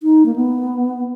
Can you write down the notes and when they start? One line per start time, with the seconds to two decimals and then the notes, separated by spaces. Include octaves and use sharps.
0.03 D#4
0.26 A#3
0.36 B3